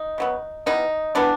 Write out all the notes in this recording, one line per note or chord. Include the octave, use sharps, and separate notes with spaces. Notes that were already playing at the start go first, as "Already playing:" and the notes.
Already playing: D#4
C#3 F#3 B3
E3 G3 B3 D#4
E3 G3 B3 D4